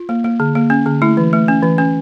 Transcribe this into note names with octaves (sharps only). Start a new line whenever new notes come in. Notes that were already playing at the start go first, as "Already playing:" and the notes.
Already playing: F4
A#3
A#3
D3
A#3
C#4
D3
A3 E4
E3
A3
C#4
E3
C#4